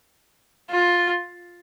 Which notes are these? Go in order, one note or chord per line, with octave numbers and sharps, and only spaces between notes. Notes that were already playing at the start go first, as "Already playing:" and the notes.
F4